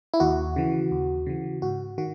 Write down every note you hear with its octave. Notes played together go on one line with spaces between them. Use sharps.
E4
D#2 F#4
C#3 E3
D#2
C#3 E3
G#2 F#4
D#3 F#4